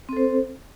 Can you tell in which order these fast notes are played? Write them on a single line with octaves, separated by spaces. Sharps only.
C4 A4 C5